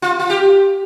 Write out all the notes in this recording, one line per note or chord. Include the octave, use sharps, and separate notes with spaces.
F4
F4
G4